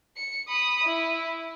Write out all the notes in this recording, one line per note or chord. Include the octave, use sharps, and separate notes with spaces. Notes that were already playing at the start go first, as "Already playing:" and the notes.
C#7
B5 D#6
E4